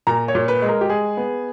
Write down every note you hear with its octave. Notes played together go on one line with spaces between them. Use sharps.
A#2 A#5
C#5
A#2
B4
G#3
A#4
G4
G#3 G#4
B3